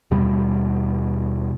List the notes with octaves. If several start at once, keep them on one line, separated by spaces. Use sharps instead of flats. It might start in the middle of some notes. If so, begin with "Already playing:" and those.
D#2 B2 G3